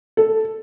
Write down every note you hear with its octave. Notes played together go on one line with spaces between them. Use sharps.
A4